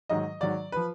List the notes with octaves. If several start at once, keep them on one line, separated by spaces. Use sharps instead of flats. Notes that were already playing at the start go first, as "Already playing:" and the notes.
G#2 D#3 F#3 D#5
G#2 D#3 F#3 D5
F3 B4